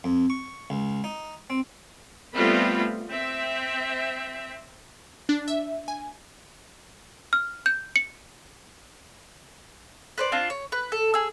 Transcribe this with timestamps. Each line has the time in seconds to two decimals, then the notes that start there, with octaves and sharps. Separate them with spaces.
0.04 F2
0.30 C#6
0.70 C#2
1.04 D#4
1.50 C4
2.34 G3 A3 B3 C4 F4 B5
3.08 C4 E5
5.29 D4
5.48 E5
5.88 G#5
7.33 F6
7.66 G6
7.96 C#7
10.18 B4 C5 D5
10.32 C4 D4 F4
10.50 C#5
10.72 B4
10.92 A4
11.14 G#4 E6